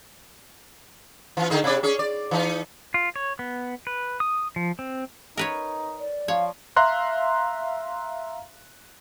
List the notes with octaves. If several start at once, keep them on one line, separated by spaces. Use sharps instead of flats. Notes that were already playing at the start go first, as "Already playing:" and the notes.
E3 F4
D3 D#4 G#4
C3 D5
C#4 G#4
D5
E3 D#4
F4
C#5
B3
B4
D#6
F3
C4
D#4 A#4 B4 C#5
D5
F3 C#5 F5
E5 F5 A#5 C6 F#6